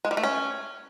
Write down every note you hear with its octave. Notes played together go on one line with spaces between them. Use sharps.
G#3
G3
A3
C#4